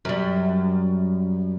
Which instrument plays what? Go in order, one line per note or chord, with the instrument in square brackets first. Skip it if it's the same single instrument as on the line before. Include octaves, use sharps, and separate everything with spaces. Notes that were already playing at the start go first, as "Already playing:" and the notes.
[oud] F#2 G3